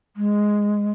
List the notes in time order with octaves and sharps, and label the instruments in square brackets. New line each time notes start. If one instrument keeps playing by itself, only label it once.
[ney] G#3